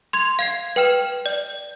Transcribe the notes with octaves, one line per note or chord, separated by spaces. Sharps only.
C6 G#6 F7
F5 G#6 C7
B4 G5 F6 E7
D5